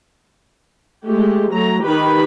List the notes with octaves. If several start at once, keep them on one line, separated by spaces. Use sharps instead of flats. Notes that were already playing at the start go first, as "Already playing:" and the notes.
G#3 A3 G4
F#3 A3 A#5
D#3 G4 B4 B5